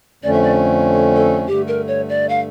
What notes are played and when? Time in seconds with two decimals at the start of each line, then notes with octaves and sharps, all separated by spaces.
0.23 F2 D3 A3 C#4 D5
0.33 E5
0.43 D5
1.16 A4
1.47 G2 D3 A3 G4
1.67 A#4
1.87 C#5
2.09 D5
2.29 F5